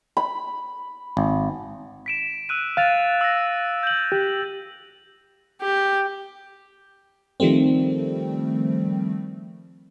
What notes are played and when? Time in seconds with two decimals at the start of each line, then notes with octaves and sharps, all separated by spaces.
0.17 B5
1.17 G#1
2.06 B6 D7 E7
2.49 E6 F#6 D#7
2.77 F5 F#6 A6 F7
3.21 E6 A#6
3.83 G6 F#7
4.12 G4
5.61 G4
7.40 D#3 F3 G3 A3 C4